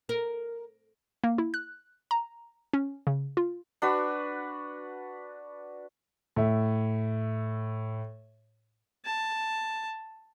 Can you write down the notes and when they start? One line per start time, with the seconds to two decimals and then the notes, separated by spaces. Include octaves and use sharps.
0.09 A#4
1.24 A#3
1.38 E4
1.54 F#6
2.11 A#5
2.73 C#4
3.07 C#3
3.37 F4
3.82 D4 F#4 B4
6.36 A2 E5
9.05 A5